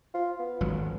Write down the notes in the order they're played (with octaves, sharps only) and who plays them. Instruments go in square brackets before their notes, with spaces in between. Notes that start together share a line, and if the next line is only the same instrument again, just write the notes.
[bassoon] F4
B3
[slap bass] G#1 F#3